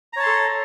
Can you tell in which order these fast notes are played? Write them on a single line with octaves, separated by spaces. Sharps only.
A#5 C#5 A5 C6 A4